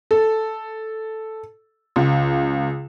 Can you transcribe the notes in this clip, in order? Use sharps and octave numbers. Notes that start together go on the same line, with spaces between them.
A4
C#2